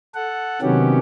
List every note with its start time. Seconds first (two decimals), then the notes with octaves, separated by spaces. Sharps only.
0.15 A4 F#5
0.62 C3 D#3 F#3 B3 C#4 G4